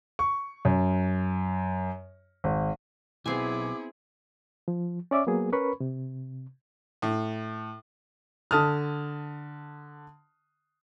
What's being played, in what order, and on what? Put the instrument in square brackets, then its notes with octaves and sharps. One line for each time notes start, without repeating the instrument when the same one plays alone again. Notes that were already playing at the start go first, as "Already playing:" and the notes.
[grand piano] C#6
F#2
G#1
[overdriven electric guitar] B1 [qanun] B3 C4 G#5 [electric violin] E4 G#4 [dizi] D6
[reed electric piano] F3
C#4 D5 E5 D6
F#3 A#3 B3 G#4
C#4 A#4 B4 B5 C#6
C3
[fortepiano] A2
[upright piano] D3 A5 D#6 F6